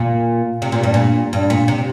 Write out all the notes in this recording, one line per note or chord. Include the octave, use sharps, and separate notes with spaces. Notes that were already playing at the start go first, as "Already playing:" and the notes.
Already playing: A#2
C3
A#2
G2
A#2
G2
A#2
C3